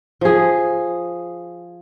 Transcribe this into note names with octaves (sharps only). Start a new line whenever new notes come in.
F3 G#4